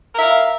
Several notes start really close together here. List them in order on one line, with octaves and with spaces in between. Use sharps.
A#4 E5 F5